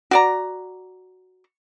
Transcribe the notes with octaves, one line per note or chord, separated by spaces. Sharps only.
F#4 D5 A#5